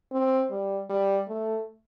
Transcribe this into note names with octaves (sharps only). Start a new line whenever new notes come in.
C4
G3
G3
A3